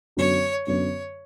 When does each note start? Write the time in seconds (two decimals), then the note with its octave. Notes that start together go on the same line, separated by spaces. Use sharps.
0.17 F#2 D3 F#3 B3 F#4 C#5
0.67 F#2 D3 F#3 B3 F#4 C#5